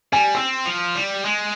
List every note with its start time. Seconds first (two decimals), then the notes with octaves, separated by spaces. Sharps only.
0.12 G3 G#5
0.35 C4 E6
0.66 F3
0.95 G3
1.25 G#3